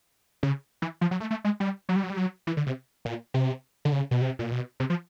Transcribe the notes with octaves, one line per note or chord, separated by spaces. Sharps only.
C#3
E3
F3
F#3
A3
A3
G#3
G3
F#3
G3
F#3
G3
F#3
E3
D3
C3
A#2
C3
D3
C#3
B2
C3
A#2
B2
C3
F3